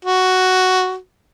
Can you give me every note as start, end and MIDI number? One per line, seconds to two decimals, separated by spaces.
0.05 0.96 66